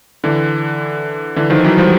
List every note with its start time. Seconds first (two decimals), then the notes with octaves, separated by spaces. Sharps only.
0.24 D3 E3
1.36 D3 E3
1.50 D#3 F3
1.64 E3 F#3
1.78 F3 G3